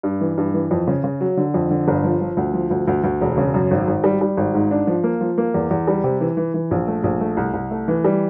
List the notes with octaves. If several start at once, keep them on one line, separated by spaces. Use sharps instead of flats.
G2
E3
G2
E3
F2
C#3
C#3
F#3
D3
F2
D3
G1
F3
F3
D2
F3
D2
D2
D2
E1
C#3
F#2
G#1
G#1
G3
G3
G#1
G#2
D4
F3
A#3
F3
A#3
E2
E2
G3
C3
E3
E3
E3
A#1
A3
A#1
A3
C2
C2
A3
E3
G3